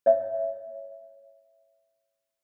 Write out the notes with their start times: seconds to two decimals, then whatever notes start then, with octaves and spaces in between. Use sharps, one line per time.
0.06 C#5 E5